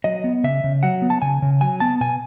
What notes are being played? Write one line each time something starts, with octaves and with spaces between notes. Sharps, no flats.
F#3 D#5
B3
C#3 E5
C#3
F#3 F#5
B3
A5
C#3 G#5
C#3
F#3 G#5
B3 A5
B2 G#5